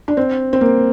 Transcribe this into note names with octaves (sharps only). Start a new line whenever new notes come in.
D4
C4
C4
A#3